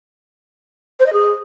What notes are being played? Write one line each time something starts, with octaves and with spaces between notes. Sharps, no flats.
C5
D#5
G#4